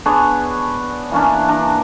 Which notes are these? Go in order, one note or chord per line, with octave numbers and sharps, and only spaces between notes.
B3 D4 G#4 C#5
E3 A#3 C#4 D4
D4 A#5